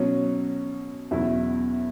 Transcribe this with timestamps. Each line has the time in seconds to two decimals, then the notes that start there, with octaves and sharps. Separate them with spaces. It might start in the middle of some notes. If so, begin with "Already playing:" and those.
Already playing: B2 F#3 C#4
1.11 E2 B2 F#3 C#4 E4